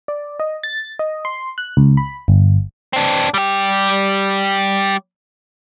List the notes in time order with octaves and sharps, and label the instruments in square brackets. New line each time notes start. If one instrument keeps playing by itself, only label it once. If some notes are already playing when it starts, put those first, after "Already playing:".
[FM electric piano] D5
D#5
A6
D#5
C6
F#6
C#2
B5
G1
[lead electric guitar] C4 D4
G3 G4